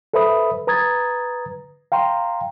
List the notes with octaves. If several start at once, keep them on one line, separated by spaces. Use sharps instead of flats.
A4 B4 C5 E5 B5 D#6
B4 A#5 D#6 G#6 A6
F5 G5 A#5 C6